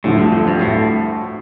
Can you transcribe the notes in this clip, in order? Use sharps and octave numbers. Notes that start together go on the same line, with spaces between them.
D2 A2 D3 F3
G2
F2
G2
A2